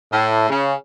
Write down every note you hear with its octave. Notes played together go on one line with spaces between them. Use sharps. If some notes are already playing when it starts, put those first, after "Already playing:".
A2
C#3